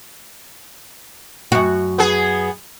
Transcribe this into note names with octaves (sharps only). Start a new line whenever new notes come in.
F#2 F#4
B3 G#4